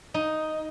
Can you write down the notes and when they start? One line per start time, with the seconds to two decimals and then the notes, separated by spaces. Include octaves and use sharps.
0.14 D#4